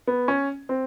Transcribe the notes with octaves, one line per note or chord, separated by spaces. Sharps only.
B3
C#4
C4